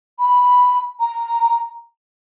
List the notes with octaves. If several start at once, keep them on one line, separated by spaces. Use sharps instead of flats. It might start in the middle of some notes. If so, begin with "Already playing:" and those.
B5
A#5